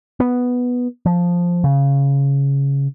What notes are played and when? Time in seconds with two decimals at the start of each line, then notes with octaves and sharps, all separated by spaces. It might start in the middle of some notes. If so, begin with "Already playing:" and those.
0.20 B3
1.06 F3
1.64 C#3